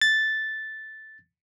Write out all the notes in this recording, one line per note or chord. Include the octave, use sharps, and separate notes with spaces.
A6